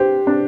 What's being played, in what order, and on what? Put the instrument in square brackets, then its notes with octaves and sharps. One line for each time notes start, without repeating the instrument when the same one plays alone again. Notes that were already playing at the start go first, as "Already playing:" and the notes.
Already playing: [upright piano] D4 C5 [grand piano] G4
[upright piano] D4